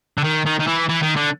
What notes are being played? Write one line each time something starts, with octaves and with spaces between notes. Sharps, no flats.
D3
D#3
D#3
D#3
E3
E3
D#3
D3